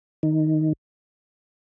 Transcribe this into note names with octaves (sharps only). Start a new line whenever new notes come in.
D#3